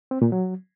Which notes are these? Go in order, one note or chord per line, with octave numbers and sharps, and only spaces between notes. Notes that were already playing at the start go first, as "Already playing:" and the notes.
C4
A#2
F#3